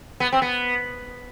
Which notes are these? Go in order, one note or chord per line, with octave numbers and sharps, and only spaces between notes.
B3
C4
B3